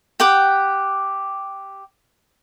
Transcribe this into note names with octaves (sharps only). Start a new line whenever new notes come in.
G4 F#5 G5 D6